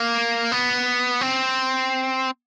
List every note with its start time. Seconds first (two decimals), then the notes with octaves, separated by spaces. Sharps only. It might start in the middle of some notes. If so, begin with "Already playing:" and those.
Already playing: A#3
0.52 B3
1.21 C4